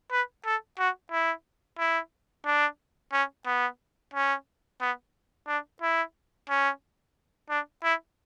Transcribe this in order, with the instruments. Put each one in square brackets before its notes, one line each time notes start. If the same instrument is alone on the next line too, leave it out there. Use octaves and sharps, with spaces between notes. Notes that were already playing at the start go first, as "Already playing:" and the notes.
[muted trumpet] B4
A4
F#4
E4
E4
D4
C#4
B3
C#4
B3
D4
E4
C#4
D4
E4